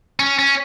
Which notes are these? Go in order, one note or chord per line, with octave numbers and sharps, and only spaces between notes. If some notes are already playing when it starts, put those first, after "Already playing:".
C#4
C#4